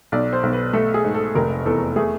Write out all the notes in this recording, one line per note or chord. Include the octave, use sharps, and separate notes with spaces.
B1 D5
C5
B1
B4
A3 A4
G#4
G#2
A4
F1 A#4
E2 A4
A3 G#4